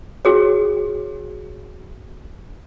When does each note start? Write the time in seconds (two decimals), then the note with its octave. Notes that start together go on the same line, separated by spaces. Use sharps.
0.25 F#4 G#4 C#5